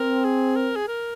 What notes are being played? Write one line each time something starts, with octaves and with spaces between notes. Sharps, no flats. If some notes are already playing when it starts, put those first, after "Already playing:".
Already playing: C4 A#4
G#4
A#4
G#4
A#4